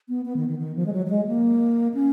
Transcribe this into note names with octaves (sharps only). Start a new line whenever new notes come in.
B3
B3
D#3
D#3
D#3
F3
G#3
F#3
F#3
G#3
A#3
C#4